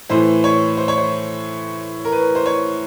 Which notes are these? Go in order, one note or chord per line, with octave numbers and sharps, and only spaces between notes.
A2 E3 C5
C#5
C5
C#5
C5
A#4
B4
C5
C#5